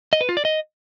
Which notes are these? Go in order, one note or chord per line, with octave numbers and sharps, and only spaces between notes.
D#5
B4
F4
D5
D#5